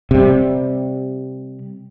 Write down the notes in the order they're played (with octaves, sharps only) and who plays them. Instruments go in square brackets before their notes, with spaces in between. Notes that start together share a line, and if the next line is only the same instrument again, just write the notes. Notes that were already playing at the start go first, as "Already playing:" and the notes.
[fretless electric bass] C3 G3